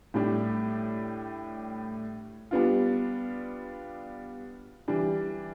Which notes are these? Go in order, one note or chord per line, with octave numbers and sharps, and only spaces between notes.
A2 G3 D4 G4
G3 B3 D4 F4
E3 G3 D4